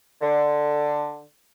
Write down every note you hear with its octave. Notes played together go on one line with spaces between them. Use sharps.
D3